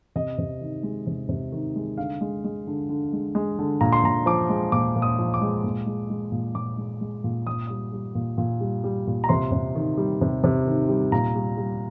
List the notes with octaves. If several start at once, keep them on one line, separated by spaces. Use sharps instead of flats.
C3 D#5
C3
D#3
G#3
C3
C3
D#3
G#3
D3 F5
G#3
G#3
D3
D3
G#3
G#3
D3
A#2 A#5
C6
A#2 A#5
F3 D6
G#3
A#2 D6
A#2
D#6
F3
D6
G#3
A#2
G#3
G#3
A#2
A#2 D6
G#3
G#3
A#2
A#2 D#6
G3 D#6
G3
A#2
A#2
G3
G3
A#2
A#5
C3 C6
C3
D#3
G3
C3
C3
D#3
G3
A#2 A#5
G3
G3